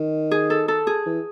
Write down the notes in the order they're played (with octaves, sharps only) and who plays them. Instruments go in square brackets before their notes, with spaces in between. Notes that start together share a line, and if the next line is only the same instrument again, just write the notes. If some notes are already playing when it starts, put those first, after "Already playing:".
Already playing: [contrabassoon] D#3
[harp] G#4
A4
A4
G#4
[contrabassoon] E3